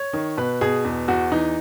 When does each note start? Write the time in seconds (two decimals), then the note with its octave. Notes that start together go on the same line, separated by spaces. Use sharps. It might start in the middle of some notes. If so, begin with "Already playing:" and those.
Already playing: C#5
0.13 D#3
0.37 B2 B4
0.61 B2 G#4
0.85 E2
1.08 E2 F#4
1.32 E3 D#4